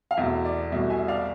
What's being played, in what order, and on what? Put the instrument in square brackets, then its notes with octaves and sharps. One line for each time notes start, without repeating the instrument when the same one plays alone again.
[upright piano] F5
E2 B2 A3 E5
D5
C2 B2 A3 E5
E5 G#5
D5 F5